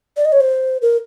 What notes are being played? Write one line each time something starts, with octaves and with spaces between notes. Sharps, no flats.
D5
D#5
C#5
C5
A#4